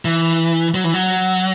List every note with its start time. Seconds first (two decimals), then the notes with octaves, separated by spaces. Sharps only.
0.05 E3
0.74 F#3
0.84 E3
0.94 F#3